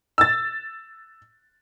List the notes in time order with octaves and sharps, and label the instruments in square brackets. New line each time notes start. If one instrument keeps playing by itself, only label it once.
[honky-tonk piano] E6 A6